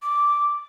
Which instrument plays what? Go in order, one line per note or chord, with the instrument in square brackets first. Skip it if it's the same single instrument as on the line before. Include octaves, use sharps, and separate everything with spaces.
[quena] D6